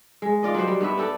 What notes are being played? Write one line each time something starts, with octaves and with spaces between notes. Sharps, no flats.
G#3
F4 D5 D#5
F#3 F#4 G4 C5
G3
G2 B3 B4 E5
D4 G4 A4